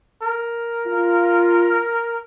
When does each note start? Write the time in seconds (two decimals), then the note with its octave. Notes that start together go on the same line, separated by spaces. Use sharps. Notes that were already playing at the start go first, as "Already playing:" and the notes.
0.23 A#4
0.86 F4